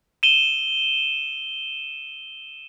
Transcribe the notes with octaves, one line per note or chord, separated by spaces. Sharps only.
D#7 E7 G7